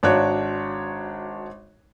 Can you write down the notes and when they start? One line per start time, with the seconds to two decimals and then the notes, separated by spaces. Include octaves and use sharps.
0.03 G#1 D4 F#4 C#5 F#6